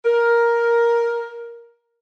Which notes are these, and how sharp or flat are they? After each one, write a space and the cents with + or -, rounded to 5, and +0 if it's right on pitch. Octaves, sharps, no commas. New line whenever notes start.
A#4 +10